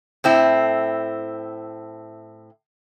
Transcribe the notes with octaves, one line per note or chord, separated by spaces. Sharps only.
A2 C4 E4